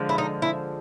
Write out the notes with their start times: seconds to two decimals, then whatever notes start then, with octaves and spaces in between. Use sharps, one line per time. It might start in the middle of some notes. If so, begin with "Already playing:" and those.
Already playing: D3 F3 G#3
0.09 E4
0.18 D#4
0.42 E4